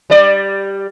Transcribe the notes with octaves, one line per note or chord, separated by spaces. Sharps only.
G3 D5